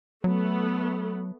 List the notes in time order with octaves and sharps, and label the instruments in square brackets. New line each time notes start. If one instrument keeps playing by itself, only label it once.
[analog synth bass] F#3 [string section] A3 B3